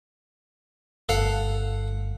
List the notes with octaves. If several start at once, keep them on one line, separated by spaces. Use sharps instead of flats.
G1 A4 F5 F#5